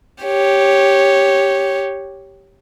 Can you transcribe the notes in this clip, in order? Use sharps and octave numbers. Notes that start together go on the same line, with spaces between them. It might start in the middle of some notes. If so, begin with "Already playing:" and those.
G4 C#5